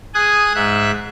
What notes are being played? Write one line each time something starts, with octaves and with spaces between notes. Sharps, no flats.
G#4 G#5 D#6 F#6
G#2 E5 F#6